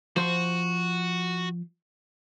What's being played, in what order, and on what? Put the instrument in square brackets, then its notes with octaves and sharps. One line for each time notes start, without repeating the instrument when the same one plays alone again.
[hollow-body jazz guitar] F3 C5 [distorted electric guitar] F#4